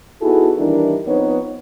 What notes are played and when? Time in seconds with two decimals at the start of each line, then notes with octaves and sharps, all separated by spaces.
0.22 B3 D#4 E4 F#4 G#4 A4
0.57 D#3 E3 G3 D4 E4 A#4
1.07 F3 B3 C4 D#4 B4 C#5